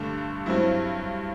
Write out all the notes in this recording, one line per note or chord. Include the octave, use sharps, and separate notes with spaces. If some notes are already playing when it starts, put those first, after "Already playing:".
Already playing: G2 D3 A3 D4
G2 F#3 C4 E4